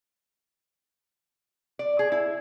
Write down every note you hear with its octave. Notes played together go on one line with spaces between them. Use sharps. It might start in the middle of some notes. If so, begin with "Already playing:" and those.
D5
G#4
E4